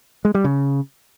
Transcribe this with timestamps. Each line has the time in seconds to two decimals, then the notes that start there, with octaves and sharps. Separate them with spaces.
0.25 G#3
0.35 G3
0.44 C#3